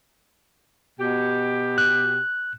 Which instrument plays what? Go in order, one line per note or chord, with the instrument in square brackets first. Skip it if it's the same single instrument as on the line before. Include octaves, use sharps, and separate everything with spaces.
[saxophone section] B2 G4
[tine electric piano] F#6